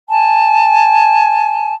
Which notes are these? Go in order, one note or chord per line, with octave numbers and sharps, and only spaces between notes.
G#5 A5